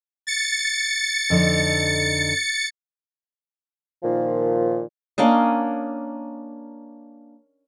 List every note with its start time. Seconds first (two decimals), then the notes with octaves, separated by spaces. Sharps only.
0.27 A6 C#7
1.30 F2 D3 D#4
4.03 A#2 D#3 F3
5.18 A#3 C#4 D4 D#5